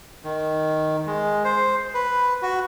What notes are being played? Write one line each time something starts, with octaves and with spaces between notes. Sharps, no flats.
D#3
G#3
C5
B4
F#4